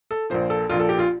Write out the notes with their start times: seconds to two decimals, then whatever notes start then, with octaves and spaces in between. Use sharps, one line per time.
0.11 A4
0.30 A#1 A#2 F3 C5
0.50 A4
0.69 A#1 A#2 F3 F4
0.79 A4
0.89 G4
0.99 F4